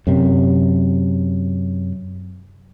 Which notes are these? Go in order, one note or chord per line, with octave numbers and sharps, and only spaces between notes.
F#2 C3